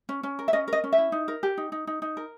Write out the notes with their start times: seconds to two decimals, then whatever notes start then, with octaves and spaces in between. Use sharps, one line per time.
0.09 C#4
0.23 C#4
0.39 A#4
0.48 E5
0.53 C#4 D#5
0.68 A#4 D#5
0.84 C#4
0.93 E5
0.98 E4
1.12 D#4
1.28 A#4
1.43 G4
1.58 D#4
1.72 D#4
1.87 D#4
2.02 D#4
2.17 A#4